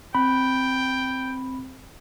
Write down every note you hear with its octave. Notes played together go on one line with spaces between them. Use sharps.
C4 G5 B5